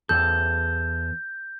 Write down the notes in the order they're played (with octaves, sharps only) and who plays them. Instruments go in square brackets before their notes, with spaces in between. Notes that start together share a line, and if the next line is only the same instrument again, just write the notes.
[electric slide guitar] E2 A4 [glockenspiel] G6